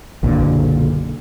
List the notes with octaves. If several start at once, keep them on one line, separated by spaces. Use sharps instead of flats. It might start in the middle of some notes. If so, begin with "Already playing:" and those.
F#1 B1 A#2 D3